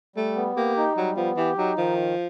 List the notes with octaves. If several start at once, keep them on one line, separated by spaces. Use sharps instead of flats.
G3 A3
B3
A#3 G4
D#4
F#3 G3
F3 B3
E3 G4
F#3 D#4
D#3 F3